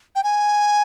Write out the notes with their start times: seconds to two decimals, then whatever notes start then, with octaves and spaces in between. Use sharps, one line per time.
0.15 G5
0.23 G#5